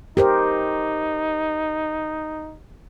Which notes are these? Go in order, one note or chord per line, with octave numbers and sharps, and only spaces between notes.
D#4 G4 A#4 C5